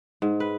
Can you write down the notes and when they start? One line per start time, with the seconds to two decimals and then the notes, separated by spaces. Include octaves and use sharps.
0.22 G#2
0.40 B4